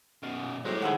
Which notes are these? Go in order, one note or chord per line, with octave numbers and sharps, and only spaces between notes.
F#2 B2 F6
A#2
A2 F#3 G#3 G4 C5 F#6
A#1 G2 D#3 G#4 C5 E5 F#5